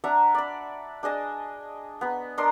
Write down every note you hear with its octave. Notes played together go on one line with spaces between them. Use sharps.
D4 E5 F#5 A#5
D5 B5
D4 G#4 D#5 A5
B3 B5
D4 A#4 D#5 C6